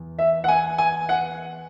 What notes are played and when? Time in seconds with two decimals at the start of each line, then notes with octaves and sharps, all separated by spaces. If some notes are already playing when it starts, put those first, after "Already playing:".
Already playing: E2
0.19 E5
0.44 F#5
0.48 G#5
0.78 G#5
1.09 F#5